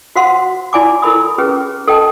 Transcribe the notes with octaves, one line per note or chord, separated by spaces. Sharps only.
F#4 C5 F5 F#5 C6
E4 D5 G#5 B5 D6
E4 A4 A#4 B5 D#6
C#4 G4 G#4 B4
A4 D#5 G5 A5